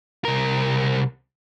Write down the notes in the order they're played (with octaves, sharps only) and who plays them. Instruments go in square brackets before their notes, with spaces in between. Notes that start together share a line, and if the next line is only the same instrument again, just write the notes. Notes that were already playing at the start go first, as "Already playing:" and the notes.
[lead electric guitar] C2 A#4